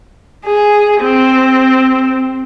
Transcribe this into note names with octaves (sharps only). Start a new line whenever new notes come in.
G#4
C4